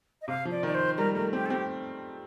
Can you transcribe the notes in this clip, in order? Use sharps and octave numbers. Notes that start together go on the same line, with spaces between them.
D#5
C3 F5
F3
D5
D#3
D5
C5
G3 A#4
A3 A#4
C4 G4
A4
C4 G4